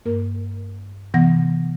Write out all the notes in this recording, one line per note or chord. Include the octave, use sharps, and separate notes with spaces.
G2 A#3 A#4
C3 E3 B3 F#5 A#6